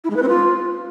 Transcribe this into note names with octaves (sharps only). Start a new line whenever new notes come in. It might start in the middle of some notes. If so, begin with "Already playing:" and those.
E4
G#3
B4
C4
F4